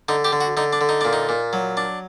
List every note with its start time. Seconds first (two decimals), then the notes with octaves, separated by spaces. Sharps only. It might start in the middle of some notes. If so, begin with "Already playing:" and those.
0.09 D3 D#4
0.25 G4
0.32 D3
0.41 F#4
0.57 D3 D#4
0.73 D4
0.81 D3
0.89 D#4
1.01 A#2 D4
1.13 D#4
1.29 A#2
1.53 F#3
1.77 D4